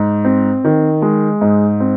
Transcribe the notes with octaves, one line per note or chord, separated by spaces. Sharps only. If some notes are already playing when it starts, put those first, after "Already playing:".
Already playing: G#2
C4
D#3
G#3
G#2
C4